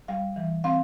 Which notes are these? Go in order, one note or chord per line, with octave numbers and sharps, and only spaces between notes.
G3 F5
E3
C4 F5